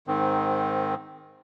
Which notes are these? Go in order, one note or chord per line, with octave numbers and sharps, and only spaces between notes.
G#2 D#3 C4